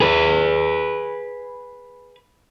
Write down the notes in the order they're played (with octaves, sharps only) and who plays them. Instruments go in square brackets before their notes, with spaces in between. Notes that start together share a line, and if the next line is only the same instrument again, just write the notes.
[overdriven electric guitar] G#4 B4